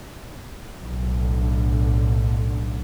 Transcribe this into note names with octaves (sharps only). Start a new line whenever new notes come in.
B1 A2 D3